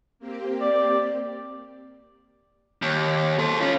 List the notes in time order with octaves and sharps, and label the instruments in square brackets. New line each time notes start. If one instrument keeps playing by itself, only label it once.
[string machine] A#3 C4 G4
[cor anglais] D5
[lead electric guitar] D#2
A4 C5
C#4 F4